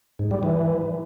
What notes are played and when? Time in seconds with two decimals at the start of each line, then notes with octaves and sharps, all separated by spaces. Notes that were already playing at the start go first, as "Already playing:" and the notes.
0.19 G#2
0.31 G3
0.43 E3